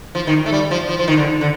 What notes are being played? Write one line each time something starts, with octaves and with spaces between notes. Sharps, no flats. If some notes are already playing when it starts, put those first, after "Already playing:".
F3
D#3
A3
G3
F3
F3
F3
D#3
D3
D3